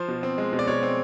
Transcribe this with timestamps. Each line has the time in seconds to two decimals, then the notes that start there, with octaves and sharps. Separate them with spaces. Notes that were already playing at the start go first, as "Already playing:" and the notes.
Already playing: F3 C5
0.08 B2
0.23 C4
0.38 G#3
0.53 B2
0.59 D5
0.67 B2 C#5
0.83 C4